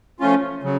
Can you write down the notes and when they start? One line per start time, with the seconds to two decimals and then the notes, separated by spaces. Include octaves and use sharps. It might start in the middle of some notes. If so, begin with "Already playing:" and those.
0.20 F3 A3 C#4 F4
0.63 C#3 F#3